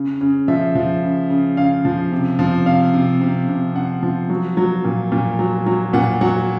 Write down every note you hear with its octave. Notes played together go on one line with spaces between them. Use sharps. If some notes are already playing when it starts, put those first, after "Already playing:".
Already playing: C#3
C#3
F3 E5
F3
C#3
C#3
C#3 F5
F3
C3
F3
C3 F5
C3
C3
C3
C3 F#5
F3
F#3
F#3
A#2
A#2
F#3
F#3
A#2 F#5
F#3 F#5